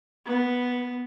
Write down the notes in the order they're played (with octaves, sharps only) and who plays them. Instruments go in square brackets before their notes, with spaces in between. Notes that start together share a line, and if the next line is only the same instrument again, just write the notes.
[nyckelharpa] B3